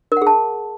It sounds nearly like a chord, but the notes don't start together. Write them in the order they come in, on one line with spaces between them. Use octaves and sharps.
A#4 F#5 G#4 A5